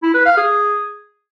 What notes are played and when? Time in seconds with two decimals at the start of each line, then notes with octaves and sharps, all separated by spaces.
0.03 E4
0.14 B4
0.26 F5
0.37 G#4